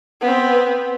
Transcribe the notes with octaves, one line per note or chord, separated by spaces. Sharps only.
B3 C4